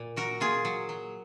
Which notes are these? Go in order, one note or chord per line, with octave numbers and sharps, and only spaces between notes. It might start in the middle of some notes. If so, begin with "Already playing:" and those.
Already playing: A#2
F#3 F#4 A#4
A#2 F4 G#4
F#3
F#3